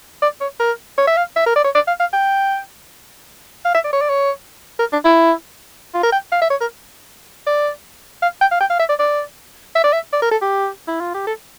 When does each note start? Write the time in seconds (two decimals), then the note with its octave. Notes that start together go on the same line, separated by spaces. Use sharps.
0.22 D5
0.41 C#5
0.59 A#4
0.98 C#5
1.07 E5
1.17 F5
1.36 E5
1.46 A#4
1.56 D5
1.64 C#5
1.75 D5
1.87 F5
2.00 F5
2.13 G5
3.65 F5
3.74 E5
3.84 D5
3.93 C#5
4.01 D5
4.09 C#5
4.79 A#4
4.92 D4
5.05 E4
5.94 F4
6.03 A#4
6.12 G5
6.32 F5
6.42 E5
6.50 C#5
6.61 A#4
7.46 D5
8.22 F5
8.41 G5
8.51 F5
8.60 G5
8.70 F5
8.79 E5
8.89 D5
8.99 D5
9.75 E5
9.84 D5
9.93 E5
10.13 D5
10.22 A#4
10.31 A4
10.42 G4
10.87 E4
11.00 F4
11.14 G4
11.27 A4